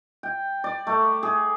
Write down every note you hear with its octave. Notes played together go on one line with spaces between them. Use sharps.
G5
D5
A3
G#4